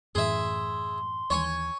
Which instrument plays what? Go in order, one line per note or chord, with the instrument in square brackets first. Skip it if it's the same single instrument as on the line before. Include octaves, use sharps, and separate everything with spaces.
[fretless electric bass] F#2 A2 E3 [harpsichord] G#4 E5 [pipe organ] C6
[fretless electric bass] D#2 E3 [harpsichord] C#5 G#5 C#6